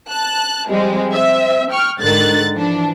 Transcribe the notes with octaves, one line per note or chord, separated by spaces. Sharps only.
A5 F#6
F3 G3 G#3 C4
C4 E5
G5 C#6 F6
G#2 D3 D#3 F#6 A6
E3 F3 D4